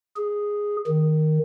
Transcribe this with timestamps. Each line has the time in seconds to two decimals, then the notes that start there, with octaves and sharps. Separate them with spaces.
0.16 G#4
0.87 D#3